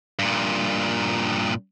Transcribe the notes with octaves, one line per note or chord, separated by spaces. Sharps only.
G2 A#2